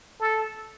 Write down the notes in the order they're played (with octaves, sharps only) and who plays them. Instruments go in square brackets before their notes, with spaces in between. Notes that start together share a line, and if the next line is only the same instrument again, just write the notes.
[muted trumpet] A4